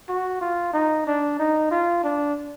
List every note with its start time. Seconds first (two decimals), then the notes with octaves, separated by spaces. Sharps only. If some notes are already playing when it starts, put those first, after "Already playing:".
0.09 F#4
0.41 F4
0.73 D#4
1.07 D4
1.39 D#4
1.71 F4
2.04 D4